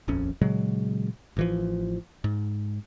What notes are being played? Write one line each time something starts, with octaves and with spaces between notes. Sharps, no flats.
D#1 A#1 F2 C#4
A#2 C#3 F#3 G#3
A1 E3 F3
G#2